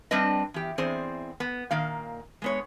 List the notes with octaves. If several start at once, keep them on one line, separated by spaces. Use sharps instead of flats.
G3 C4 D4 B4 D#5
E2 G4
E2 C4 G#4 C5 D5
B3
A#2 D#3 A#3 F5
G#3 B3 C#5